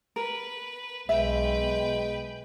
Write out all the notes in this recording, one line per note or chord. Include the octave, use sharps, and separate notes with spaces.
A#4 B4
B1 G#3 B4 E5 G5